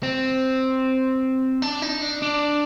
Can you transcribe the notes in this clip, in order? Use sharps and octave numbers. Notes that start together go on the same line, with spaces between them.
C4
D4
D#4
D4
D4